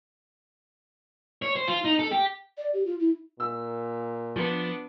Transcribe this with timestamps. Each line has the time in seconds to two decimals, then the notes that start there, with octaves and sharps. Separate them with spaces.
1.42 C#5
1.56 C5
1.68 F4
1.84 D#4
1.99 A4
2.11 G4
2.58 D5
2.74 G4
2.86 F4
3.00 E4
3.40 A#2 E6
4.36 F3 B3 D4